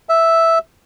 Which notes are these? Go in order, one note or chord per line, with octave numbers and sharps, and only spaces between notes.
E5